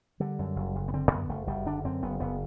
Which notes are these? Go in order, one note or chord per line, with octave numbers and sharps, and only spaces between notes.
D3 G3
F#2
F#1
F#1
B3
D3 C4
F#2 B3
F#1 A3
F#1 G3
D3 D4
F#2 C4
F#1 B3
F#1 B3